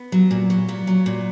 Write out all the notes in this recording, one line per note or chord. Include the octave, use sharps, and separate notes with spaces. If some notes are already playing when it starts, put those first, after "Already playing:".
Already playing: B3
F#3
A#2
F#3
A#2 B3
F#3
A#2